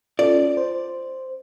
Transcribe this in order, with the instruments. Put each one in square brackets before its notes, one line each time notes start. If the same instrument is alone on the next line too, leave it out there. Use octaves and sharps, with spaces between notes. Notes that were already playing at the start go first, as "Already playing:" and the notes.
[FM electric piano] C#4 F4 A4 [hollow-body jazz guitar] D5
[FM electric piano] C5